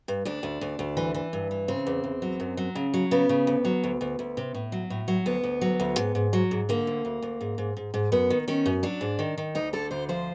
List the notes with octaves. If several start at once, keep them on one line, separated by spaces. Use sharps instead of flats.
G2
D2 D4
D2
D2
D2
E3
E3
G2
E3
C#3 C4
E2
E2
F#3
F#2
F#3
C#3
F#3
C#3 B3
C#3
D2
F#3
D2
D2
D2
C3
A2
F#3
A2
F#3
D2 B3
D2
F#3
D2
G#2
G#2
F#3
G#2
D3 A#3
D2
D2
D2
G#2
G#2
G#2
G#2
F#2 B3
D#3
D#3 C#4
F#2
F#3 D4
G#2
D#3
D#3
D2 D#4
D3 A4
D2 C5
F3 C5